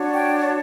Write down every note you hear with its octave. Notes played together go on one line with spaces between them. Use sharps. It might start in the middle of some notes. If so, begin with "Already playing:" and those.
Already playing: D4 F#4 C#5
G5